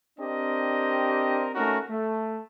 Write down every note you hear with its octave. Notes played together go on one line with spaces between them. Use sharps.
C4 D4 G4 A#4 D#5
A3 C#4 D#4 F#4 A#4
A3